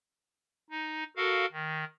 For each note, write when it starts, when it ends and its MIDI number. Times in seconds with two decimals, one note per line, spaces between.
0.70 1.04 63
1.17 1.46 66
1.17 1.46 69
1.17 1.46 70
1.17 1.46 77
1.52 1.84 51